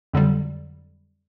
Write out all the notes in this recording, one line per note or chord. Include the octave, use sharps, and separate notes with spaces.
F2 D3 F#3 G3